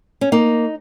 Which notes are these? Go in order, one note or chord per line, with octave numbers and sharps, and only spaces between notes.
C#4
A#3 D#4